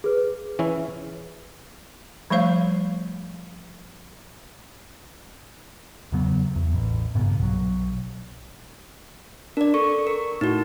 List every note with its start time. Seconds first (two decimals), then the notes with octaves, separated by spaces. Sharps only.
0.04 G#4 B4
0.59 E3 C#4 E4
2.30 F3 G3 A3 C5 F5
6.12 E2 C#3 F#3 B3
6.56 E2
6.73 A1
7.15 G2 A#2 C#3 B3
7.39 B1 F#3
9.57 D4 A#4 D5
9.74 A4 C#6
10.07 A#4
10.41 A2 D#4 F#4